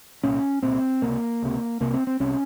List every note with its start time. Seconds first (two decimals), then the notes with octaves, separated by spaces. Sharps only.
0.23 C2 A#2 C#4
0.63 C2 A#2 C4
1.02 C#2 C3 A#3
1.42 C#2 C3
1.81 C2 C3 A#3
1.94 C4
2.07 C4
2.20 C2 C3 C#4